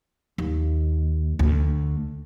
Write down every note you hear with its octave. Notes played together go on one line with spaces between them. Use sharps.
D#2
D2